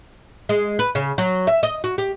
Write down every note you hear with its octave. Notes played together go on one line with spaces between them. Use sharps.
G#3
B4
C#3
F#3
E5
D#5
F#4
G4